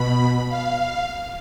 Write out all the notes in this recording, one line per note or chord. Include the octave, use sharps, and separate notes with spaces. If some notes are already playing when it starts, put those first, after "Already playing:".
Already playing: B2 B5
F5